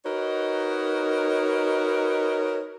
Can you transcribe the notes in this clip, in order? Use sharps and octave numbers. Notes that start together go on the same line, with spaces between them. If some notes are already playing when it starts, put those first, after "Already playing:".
D#4 F#4 A#4 B4 C#5 D#5